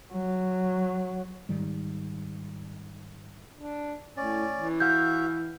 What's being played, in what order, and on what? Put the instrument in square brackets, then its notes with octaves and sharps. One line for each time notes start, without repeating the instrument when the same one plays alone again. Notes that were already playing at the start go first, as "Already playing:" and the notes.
[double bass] F#3
[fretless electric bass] G#2 D#3 G3
[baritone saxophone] D4
[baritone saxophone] A2 [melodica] C#4 D5
[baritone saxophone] E3
[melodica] F#4 E5 F5 [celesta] G6